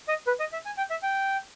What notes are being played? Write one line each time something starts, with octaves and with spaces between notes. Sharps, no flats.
D#5
B4
D#5
E5
G#5
G5
E5
G5